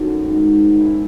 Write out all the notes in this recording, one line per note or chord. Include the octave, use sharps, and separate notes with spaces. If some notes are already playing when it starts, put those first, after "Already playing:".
Already playing: F#2 D#3 F#3 A3 D#4
G#2 D#3 F#3
F#2 D#3 G#3 E4